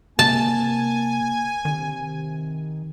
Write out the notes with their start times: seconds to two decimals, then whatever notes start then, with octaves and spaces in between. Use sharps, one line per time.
0.19 C3 A#3 G#5 A5
1.65 C3 D#3